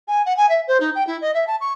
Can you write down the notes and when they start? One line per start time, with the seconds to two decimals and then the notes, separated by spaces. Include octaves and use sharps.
0.07 G#5
0.25 F#5
0.36 G#5
0.49 E5
0.67 C5
0.80 D#4
0.95 G5
1.07 E4
1.21 D#5
1.34 E5
1.47 A5
1.60 C#6